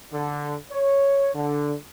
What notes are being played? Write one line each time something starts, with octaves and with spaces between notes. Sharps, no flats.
D3
C#5
D3